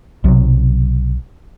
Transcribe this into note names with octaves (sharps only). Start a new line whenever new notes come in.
B1 C3 F#3